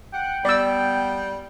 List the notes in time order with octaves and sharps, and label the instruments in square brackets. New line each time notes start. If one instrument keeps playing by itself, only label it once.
[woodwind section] F#5 [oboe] G5
[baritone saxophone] G3 [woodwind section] B3 [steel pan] D5 E6